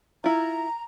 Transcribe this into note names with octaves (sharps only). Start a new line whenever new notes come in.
E4 F4 A#5